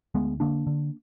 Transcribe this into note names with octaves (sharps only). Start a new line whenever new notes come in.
D2 G#3 B3
D3 A#3 D4
D3